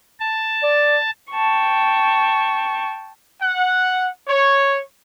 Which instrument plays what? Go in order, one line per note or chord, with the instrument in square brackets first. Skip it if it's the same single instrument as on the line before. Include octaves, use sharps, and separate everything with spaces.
[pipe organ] A5
[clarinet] D5
[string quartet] G5 A5 C#6
[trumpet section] F#5
C#5